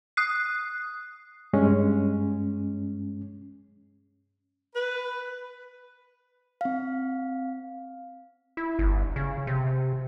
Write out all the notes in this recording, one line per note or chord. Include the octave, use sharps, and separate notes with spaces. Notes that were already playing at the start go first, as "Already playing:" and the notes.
D#6 F#6 C7
G2 G#3 C#4
B4
C4 F5
E4
G1
C#3
C3